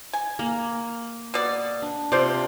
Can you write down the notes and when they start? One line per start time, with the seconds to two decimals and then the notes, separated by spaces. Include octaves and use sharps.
0.13 G#5
0.39 A#3
1.34 B2 D5
1.82 D4
2.12 C3 D4 F4 C5 D5